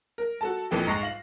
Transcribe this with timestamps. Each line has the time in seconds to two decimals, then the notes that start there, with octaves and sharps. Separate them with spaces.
0.18 A#4
0.41 F#4 A4 A5
0.71 A#1 F2 E3 A4 G5
0.87 G#2 C#6 A#6 C7
1.03 F5 F#7